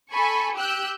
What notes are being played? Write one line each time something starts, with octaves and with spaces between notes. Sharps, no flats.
A4 G#5 B5 C#6
G4 E6 F#6 G6